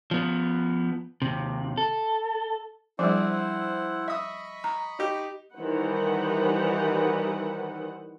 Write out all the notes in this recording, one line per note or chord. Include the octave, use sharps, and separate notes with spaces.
F3 B3
D#2 C3
A4
F3 G3 C4 D4 E4 G#4 C5 F#5
D#5 E5 B5 C#6 D#6
A#5
D#4 G4
D#3 E3 G3 B4 C5 F#5